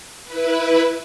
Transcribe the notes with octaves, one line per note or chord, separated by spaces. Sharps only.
E4 B4